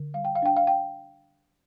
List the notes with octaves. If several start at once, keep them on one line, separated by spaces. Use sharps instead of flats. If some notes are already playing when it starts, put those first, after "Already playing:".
Already playing: D3
G3 F5
G5
F5
D4 G5
F5
G5